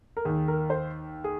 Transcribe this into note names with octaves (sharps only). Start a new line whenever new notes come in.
A#4
D#2 D#3 G#4
A#4
C5
G#4